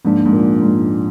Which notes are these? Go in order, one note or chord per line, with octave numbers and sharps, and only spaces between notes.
G#2 F3 A#3 D4
G#2
A#2
G#2